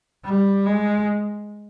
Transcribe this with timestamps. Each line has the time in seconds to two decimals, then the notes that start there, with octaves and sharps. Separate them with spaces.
0.25 G3
0.66 G#3